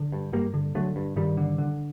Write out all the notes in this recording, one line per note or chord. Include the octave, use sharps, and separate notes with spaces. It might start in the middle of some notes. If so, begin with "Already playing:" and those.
Already playing: D3
G2
G2 G3 A#3
D3
D3 F#3 A3
G2
G2 D#3 G3
D3
D3